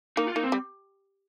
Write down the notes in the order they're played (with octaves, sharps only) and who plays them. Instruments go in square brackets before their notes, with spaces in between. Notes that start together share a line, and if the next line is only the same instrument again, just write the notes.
[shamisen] A#3 [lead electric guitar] D#4
[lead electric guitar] F4
[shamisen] A#3 [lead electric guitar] D#4
[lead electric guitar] C4
[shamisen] G3